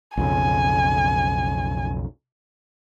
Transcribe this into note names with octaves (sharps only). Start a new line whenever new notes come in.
B1 F2 C#3 G#5